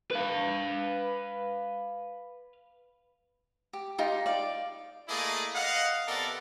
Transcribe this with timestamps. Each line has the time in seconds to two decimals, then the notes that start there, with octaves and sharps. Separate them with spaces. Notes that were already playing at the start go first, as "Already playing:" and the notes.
0.11 B4 F5
3.73 G4
3.98 D#4 F4 G4
4.26 D5 F5
5.09 A3 A#3 E4 G#4 D5 D#5
5.55 D#5 F5 F#5
6.08 C3 B3 A4 A#4 D5